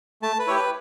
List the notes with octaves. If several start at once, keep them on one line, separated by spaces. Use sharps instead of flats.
A3 A5
B4
E4 G4 C#5
B4